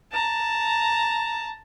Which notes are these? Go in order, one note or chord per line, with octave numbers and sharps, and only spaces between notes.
A5 A#5